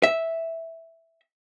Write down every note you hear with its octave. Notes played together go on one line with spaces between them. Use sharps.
E5